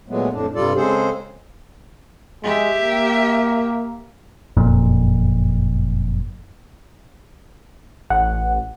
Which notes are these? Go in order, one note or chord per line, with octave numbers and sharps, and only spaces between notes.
A#2 F#3 G#3 A3 B3
F2 A2 D4
G2 C3 G3 F4 A4 D5
C#3 G#3 C4 G#4 A4 C5
G#3 G4 E5
A#3
F#1 F2 A#2
A1 F#5